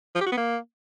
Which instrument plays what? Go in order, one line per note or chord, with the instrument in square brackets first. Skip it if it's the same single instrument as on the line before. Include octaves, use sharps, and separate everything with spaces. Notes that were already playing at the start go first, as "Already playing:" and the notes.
[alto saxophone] F3
G4
F#4
B3
A#3